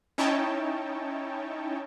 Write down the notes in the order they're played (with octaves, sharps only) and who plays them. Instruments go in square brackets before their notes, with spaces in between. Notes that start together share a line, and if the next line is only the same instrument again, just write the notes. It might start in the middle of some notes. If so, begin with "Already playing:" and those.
[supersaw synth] C#4 D#4 E4 C#5 G5 A5